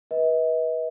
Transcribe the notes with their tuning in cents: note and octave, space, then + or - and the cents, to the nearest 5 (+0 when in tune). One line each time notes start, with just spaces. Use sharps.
B4 -25 D#5 +45